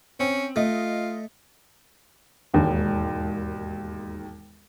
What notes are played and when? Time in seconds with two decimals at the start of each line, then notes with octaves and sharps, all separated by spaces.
0.20 C4 C#4
0.56 A3 F4 D#5
2.54 E1 D#2 G#2 D#3